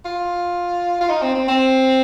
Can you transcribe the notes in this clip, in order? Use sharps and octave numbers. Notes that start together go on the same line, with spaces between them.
F4
F4
D#4
C4
C4
C4